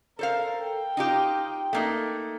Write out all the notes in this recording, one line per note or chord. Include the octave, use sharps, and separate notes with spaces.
A4 A#4 C5 F5
G5
D#4 F4 G4
A3 A#3 D#4